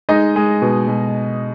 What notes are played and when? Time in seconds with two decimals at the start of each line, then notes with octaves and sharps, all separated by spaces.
0.09 G#3 D#4 D#5
0.36 G#3
0.62 B2
0.88 B2